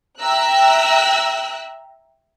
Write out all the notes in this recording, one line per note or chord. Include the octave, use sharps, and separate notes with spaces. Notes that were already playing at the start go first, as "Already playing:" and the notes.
E5 G5 A#5 E6 F#6